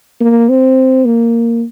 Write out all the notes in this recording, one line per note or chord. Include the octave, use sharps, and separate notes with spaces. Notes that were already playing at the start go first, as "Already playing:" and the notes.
A#3
C4
A#3